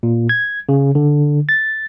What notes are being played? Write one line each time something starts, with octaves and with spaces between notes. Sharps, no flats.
A#2
G#6
C#3
D3
A6